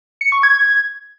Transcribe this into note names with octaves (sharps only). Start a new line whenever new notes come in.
C#7
C#6
G#6